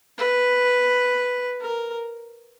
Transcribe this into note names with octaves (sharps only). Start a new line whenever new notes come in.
B4
A#4